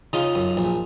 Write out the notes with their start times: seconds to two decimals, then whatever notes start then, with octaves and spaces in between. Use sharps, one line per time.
0.13 C#3 D#4 F4
0.35 F#2
0.57 A#1